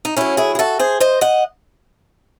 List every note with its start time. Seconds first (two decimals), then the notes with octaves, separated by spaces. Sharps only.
0.05 D#4
0.17 A2 F#3 C#4 E4
0.37 E4 G#4
0.55 G#4
0.59 F#4 A4
0.79 G#4 C5
1.00 C5 D#5
1.21 D#5 F#5